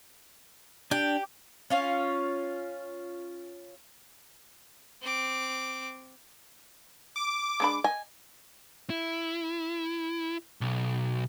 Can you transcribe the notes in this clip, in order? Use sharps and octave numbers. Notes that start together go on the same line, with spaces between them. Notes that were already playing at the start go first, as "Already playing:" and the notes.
D4 G4 G5
C#4 F4 C#5
C4 D6
D6
G#3 D4 B5
D#5 G#5
E4
B1